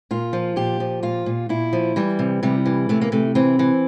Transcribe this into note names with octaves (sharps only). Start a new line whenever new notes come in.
A#2 F4
F3
A#2 G4
F3
A#2 F4
A#2
A#2 E4
F3
E3 G3
C3
C3 G3
E3
C3 A3
A#3
C3 A3
E3 C4
E3